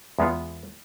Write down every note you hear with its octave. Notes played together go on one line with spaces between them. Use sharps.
E2 G#3 B3 F4